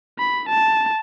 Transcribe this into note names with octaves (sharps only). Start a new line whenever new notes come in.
B5
A5